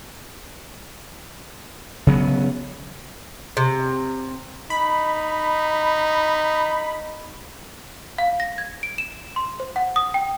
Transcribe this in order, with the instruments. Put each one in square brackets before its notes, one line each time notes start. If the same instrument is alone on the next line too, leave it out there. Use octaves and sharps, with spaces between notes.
[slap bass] C#3 F#3 B3
[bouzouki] C3
[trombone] D#4 [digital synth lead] B5
[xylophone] F5
A#6
G#6
D7
E7
C6
C5
F#5
D#6
G5